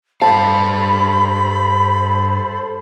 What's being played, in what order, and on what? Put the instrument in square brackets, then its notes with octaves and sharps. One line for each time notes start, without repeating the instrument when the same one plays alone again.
[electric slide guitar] G2 D#3 F5 [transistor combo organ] A4 C5 [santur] A5 [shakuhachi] B5